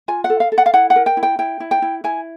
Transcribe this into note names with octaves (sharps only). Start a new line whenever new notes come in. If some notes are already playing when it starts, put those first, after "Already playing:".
F4 G#5
F#5
A4
F5
A4
F#5
F5
E4 F#5
F#5
A#4
G5
E4
G5
E4 G5
E4
G5
E4
E4 G#5